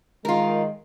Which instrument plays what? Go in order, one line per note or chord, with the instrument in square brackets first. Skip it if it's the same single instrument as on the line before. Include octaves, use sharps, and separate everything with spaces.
[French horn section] D#3 G#3 [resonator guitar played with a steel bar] F4 A#4